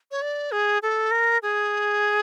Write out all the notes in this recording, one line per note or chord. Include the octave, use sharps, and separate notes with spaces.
C#5
D5
G#4
A4
A#4
G#4